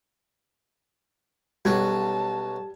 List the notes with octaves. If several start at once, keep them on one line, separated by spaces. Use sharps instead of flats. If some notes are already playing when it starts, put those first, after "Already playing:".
B1 G3 C#4 F#4 A5 G#6